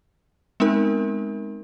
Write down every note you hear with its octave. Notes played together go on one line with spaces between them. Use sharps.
G#3 B3 C4 D#4 A#4